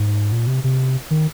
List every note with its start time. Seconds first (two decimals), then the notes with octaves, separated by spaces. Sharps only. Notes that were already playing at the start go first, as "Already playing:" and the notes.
Already playing: G#2
0.32 A#2
0.47 C3
0.64 C3
1.10 D#3